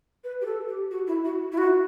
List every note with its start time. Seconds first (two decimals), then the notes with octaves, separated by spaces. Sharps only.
0.24 B4
0.41 G4
0.46 A4
0.69 G4
0.91 F#4
1.07 E4
1.25 F#4
1.52 E4
1.58 F#4